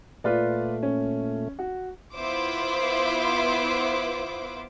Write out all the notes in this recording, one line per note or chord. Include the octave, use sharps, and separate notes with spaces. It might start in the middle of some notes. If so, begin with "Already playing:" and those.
A#2 A3 F4 B4 D5
C#4
F#4
B3 E4 F4 C5 D6